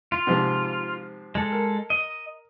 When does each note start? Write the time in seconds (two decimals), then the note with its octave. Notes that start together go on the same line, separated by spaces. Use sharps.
0.12 F4
0.27 G#2 C3 F3
1.35 G#3 A4
1.52 A#4
1.90 D#5